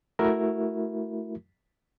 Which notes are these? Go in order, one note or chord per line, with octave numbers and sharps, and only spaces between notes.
A3 E4 F#4 A#4 E5